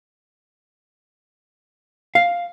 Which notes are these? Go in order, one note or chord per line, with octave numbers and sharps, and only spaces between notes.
F5